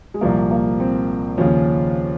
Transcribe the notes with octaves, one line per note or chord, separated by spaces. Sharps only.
G#3
C2 A#2 F3 A#3
A#3
C4
D#2 C#3 F3 C#4